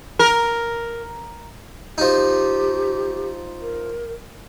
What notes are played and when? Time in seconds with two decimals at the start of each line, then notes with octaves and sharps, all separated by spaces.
0.19 A#4
1.98 F3 D#4 G4
3.61 A#4